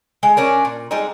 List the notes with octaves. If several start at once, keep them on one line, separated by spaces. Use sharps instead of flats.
G#3
C#4 D4 A#4
A#2
G3 G#3 C4 D#4